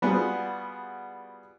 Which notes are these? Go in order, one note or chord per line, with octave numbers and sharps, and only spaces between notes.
G3 B3 F4 F#4 G#4